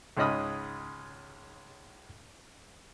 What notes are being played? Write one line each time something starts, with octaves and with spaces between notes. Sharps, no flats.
C#2 G#2 C#4 D#5 B5 D#6